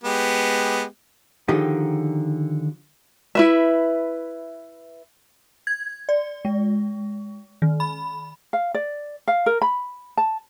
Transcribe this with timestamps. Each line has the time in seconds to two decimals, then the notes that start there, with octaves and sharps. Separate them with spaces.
0.03 G#3 B3 G4
1.48 D3 D#3 F3 D#4 G4 G#4
3.35 E4 B4 E5
5.67 G#6
6.09 D5
6.45 G#3
7.62 D#3
7.80 B5
8.53 F5
8.74 D5
9.28 F5
9.46 A#4
9.62 B5
10.17 A5